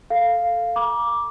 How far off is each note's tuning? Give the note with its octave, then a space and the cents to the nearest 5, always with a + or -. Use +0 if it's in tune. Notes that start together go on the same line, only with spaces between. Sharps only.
A4 +0 F5 +0
A#5 +35 D6 +0